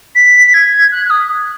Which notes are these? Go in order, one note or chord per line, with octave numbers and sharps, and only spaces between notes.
B6
B6
G#6
F#6
F#6
D#6